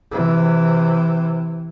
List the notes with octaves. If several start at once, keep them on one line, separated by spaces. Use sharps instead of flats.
C3 E3